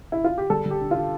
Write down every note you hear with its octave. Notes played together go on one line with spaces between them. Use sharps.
E4
F4
G4
G3 A4
G3
G4
D3
F4